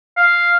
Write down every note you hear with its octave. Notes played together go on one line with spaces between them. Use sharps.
F5